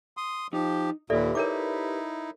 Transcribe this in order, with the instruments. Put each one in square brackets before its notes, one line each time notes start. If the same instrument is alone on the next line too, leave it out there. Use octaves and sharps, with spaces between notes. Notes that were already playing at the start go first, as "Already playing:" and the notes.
[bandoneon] C6 D#6
[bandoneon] F3 G4 [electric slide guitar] D#4
[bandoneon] D#2 A#2 [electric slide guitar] G4 B4 [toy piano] A4 D5 E5
[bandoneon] D#4 E4 [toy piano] A#4 C#5 D6